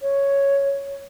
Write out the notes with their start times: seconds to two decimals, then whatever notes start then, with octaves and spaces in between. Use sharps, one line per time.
0.02 C#5